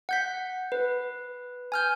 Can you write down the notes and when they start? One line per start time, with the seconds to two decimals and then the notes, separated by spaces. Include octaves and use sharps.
0.09 F#5 G6 B6
0.72 B4
1.72 G#5 F6 G6